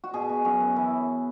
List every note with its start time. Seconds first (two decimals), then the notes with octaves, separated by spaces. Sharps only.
0.04 F#4
0.14 B2 G#4
0.29 B2
0.45 F#2 F#4
0.60 F#2
0.76 E3 E4